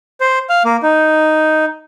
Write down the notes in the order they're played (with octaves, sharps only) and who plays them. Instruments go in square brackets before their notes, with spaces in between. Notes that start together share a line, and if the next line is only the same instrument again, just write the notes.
[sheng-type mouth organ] C5
F5
A#3
D#4